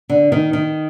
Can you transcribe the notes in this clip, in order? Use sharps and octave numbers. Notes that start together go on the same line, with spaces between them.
D3
D#3
D#3